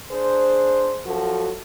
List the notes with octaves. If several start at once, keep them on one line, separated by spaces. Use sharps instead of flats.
D4 G#4 C5
F#2 F3 F#4 A4